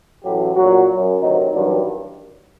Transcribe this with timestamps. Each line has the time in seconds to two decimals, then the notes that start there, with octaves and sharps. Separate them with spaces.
0.24 A1 A2 F#3 G4
0.56 A#1 A#2 F#3 F#4
0.88 F#2 F#3
1.20 D2 C3 D#3 F#3 D#4
1.52 A1 G2 D#3 F#3 D4